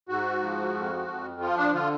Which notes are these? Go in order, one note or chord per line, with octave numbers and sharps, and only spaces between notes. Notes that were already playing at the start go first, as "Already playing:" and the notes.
G#2 F#4
F3
F2
F2
F3 F4
D4
D3 F4